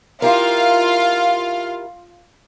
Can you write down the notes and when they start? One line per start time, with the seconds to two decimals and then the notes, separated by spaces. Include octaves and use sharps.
0.22 E4 F4 G4 A#4 F5